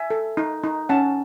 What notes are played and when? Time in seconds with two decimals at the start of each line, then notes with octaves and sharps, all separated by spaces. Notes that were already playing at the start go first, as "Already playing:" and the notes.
Already playing: E5 G#5
0.10 A4
0.37 D#4
0.63 D#4
0.89 C#4 F#5 A5